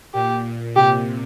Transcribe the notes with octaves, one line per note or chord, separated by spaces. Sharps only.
A#2 G4
A#2
C3 G4